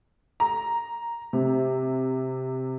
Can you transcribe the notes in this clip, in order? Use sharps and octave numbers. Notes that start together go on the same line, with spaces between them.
A#5
C3